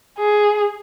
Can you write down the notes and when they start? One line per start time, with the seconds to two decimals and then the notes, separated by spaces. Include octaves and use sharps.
0.18 G#4